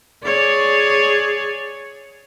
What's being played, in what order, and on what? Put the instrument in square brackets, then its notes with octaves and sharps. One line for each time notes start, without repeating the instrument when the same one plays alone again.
[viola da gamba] G#4 C#5 D5